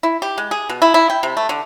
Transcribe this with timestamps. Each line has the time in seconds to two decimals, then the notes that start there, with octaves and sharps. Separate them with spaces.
0.03 E4
0.22 G4
0.38 G#3
0.51 G#4
0.69 B2
0.82 E4
0.94 E4
1.10 G5
1.23 C3
1.37 A3
1.49 D3